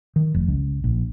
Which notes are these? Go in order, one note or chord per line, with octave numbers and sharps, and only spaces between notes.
D#3
F1
C#2
A#1